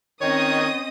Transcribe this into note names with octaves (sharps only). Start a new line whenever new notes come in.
D#3 C4 C#4 C#5 D#5 D#6